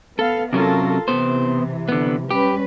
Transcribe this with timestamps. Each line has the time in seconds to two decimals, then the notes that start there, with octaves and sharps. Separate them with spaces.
0.19 B3 A4 F5
0.53 C3 F#3 C#4 F4 A4 A#4
1.08 C3 E3 B3 C5
1.89 D3 B3
2.31 G3 C#4 G4 B4